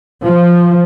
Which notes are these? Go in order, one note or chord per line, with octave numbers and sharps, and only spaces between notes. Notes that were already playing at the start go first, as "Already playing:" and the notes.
F3